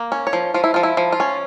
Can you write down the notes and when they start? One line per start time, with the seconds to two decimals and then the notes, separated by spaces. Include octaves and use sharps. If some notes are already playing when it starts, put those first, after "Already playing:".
Already playing: A#3
0.12 C#4
0.27 C#5
0.33 F3
0.54 F3 F4
0.64 E4
0.74 F3 F4
0.83 E4
0.97 F3
1.12 F4
1.20 C#4